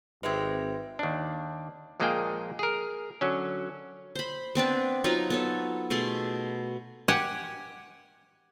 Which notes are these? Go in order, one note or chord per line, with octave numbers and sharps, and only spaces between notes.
G#1 G#3 C4 G4 B4 E5 G#6
D#2 D4
A#1 A#2 G#3 A#3 G#4 G5
G#4 A#4
D3 F#3 C#4
C5 B5
B3 C4 D4 B4
F#3 D#4 F4 B4
B3 A4 C#5
B2 A3 G#4 C6
G4 F#5 G#5